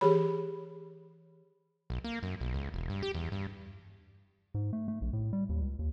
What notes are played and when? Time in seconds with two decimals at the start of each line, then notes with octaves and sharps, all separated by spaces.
0.01 E3 G4 G#4 C#5 B5
1.90 B1
2.04 A#3
2.23 F#2
2.41 B1
2.54 C#2
2.74 E1
2.89 G2
3.03 G4
3.15 E2
3.32 G2
4.54 G#2
4.73 A3
4.88 A3
5.01 A#1
5.13 A2
5.33 G3
5.49 D#2
5.61 C#2
5.79 D#2